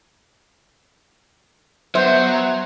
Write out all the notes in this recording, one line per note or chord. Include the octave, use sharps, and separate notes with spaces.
F#3 B3 C5 E5